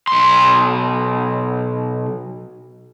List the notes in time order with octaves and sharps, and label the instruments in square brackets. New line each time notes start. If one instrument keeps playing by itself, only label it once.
[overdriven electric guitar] B1 C6